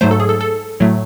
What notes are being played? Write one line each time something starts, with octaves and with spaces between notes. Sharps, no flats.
G#2 F#3 A3 C5
A4
G#4
A4
A4
A2 F#3 A3